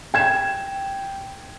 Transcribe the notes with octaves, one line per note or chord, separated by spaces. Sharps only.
G5 G#6 E7